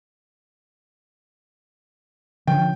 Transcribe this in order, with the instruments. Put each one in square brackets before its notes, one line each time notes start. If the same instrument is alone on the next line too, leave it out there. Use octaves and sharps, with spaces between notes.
[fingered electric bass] D3 F3 C#4 [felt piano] G5